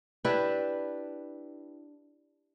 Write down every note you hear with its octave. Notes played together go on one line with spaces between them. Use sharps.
D4 E4 G4 B4